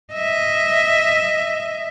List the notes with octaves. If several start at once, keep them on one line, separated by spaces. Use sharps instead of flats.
D#5 E5